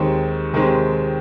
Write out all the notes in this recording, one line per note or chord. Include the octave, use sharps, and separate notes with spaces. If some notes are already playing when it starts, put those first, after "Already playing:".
Already playing: D#2 D#3 G#3 C4 G4
D#2 D#3 G#3 C4 G4